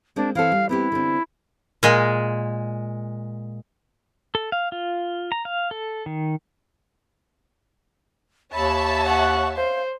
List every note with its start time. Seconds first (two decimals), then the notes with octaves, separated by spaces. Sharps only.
0.16 G#3 A#3 C4 D4
0.35 E3 C4 A4 F5
0.52 G3
0.69 B3 C4 E4 G4
0.92 D3 C4
1.83 A#2 G#3
4.35 A4
4.52 F5
4.72 F4
5.32 A#5
5.45 F5
5.71 A4
6.06 D#3
8.54 D#2 C#5 E5 A5 B5
9.06 F#5 C#6 F#6
9.56 C5 F5